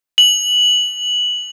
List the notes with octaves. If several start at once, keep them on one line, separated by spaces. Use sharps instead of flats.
F#7